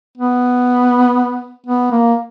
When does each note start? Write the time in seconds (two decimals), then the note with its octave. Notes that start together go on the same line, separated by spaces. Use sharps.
0.17 B3
1.66 B3
1.91 A#3